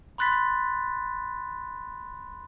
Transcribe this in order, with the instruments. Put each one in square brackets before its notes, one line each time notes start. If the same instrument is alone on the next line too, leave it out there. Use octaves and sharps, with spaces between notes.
[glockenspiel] B5 C6 F#6 A6 B6